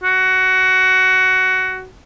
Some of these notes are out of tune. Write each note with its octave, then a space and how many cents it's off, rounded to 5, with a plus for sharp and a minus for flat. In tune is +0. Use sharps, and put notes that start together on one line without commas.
F#4 +15